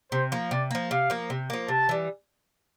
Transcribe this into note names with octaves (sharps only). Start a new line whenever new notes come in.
C3 C5
F3 A#3
C3 D5
F3 A#3
C3 F5
F3 A#3
C3
F3 A#3
C3 A5
E3 G3